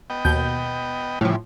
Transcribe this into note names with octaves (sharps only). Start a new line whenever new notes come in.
B3 D#5 G5
D#2 B2 G6
A2 C#3 E3 F3 G3